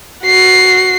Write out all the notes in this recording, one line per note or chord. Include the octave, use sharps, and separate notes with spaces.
F#4 C7